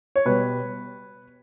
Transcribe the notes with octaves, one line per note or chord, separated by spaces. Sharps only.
C#5
B2 G3 B4